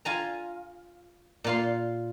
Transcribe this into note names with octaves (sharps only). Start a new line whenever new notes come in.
F4 G#5 A#5
A#2 F4 C6